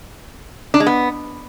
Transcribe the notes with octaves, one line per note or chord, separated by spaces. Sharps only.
D4
G#3
B3